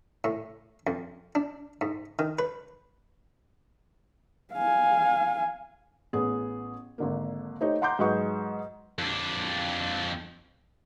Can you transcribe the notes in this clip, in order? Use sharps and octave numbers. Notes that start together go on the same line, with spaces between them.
A2
F2
D4
G#2
D#3
B4
F5 G#5
A1 B3 G#4
G#1 D3 A#3
A3 D#4 G4 C5 C#5
F#5 A#5 C6 D6 G6
G#2 F#3 G#4 B4 F#5 C#6
F2 D4